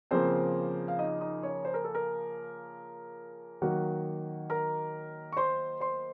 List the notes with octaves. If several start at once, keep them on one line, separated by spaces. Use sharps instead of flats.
C#3 F3 A#3 C4 C5
F5
D#4 D#5
D#4 D#5
C#4 C#5
C5
A#4
A4
A#4
D#3 F#3 A#3 F#4 F#5
A#4 A#5
C#6
C5 C6
C5 C6